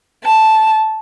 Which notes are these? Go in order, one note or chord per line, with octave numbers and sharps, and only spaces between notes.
A5